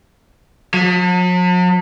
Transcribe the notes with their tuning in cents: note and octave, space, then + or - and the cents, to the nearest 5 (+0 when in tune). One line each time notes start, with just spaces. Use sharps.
F#3 -45